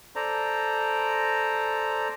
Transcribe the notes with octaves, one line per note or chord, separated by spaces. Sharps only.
A4 C5 D5 A#5